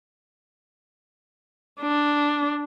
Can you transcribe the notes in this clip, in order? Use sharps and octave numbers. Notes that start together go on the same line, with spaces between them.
D4